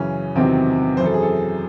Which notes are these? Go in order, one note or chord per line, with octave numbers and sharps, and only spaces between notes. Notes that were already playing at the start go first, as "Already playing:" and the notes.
Already playing: F#2 C#3 E3 C#4
E2 C3 D#3 F#3 C4
F#2 E3 C5
A4
G#4
A4